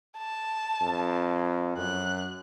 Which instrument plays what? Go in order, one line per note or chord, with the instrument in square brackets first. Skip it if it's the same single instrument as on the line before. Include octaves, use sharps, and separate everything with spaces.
[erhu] A5
[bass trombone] F2
[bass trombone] F#2 [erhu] F#6